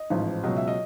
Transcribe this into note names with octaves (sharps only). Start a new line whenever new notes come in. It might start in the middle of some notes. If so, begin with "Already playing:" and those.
Already playing: D#5
A1 G#2 F3
C#2 B2 F#3 D#5
E5
D#5